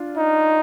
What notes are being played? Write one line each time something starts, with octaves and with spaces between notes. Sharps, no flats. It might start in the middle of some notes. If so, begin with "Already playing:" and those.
Already playing: D4 F4
D#4